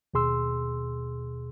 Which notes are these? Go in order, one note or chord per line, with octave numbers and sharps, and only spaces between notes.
D#2 B2 G#4 C6 E6